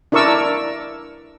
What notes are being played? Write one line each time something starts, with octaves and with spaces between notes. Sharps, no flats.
D4 E4 A#4 D5 C#6 E6